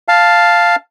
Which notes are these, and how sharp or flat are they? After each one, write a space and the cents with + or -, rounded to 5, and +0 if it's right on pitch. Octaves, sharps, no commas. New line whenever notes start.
F5 +0 A5 +0